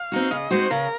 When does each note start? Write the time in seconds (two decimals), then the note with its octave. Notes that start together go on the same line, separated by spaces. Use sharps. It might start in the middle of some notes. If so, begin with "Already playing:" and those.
Already playing: F5
0.12 C4 D#4 F#4
0.31 C#3 D#5
0.51 G#3 C4 D#4 F#4 C5
0.70 C#3 A#4